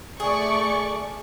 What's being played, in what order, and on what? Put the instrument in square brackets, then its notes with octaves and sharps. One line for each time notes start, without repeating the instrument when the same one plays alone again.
[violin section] A3 D5 C#6 [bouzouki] G#4